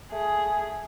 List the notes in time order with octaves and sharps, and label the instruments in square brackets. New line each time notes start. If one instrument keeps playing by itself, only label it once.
[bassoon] A3 [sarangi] G#4